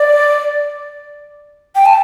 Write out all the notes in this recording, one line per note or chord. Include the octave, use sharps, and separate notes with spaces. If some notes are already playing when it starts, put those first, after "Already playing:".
Already playing: D5
G5
A5